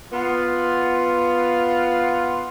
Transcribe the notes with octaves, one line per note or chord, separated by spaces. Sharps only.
B3 F4